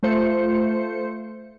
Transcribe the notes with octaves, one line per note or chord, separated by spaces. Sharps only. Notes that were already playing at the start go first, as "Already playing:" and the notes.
A3 F4 C5 C#7